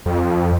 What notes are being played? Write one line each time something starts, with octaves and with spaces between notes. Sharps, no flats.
F2